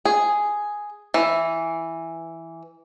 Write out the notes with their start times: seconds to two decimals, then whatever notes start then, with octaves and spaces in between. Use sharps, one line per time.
0.05 G#4
1.14 E3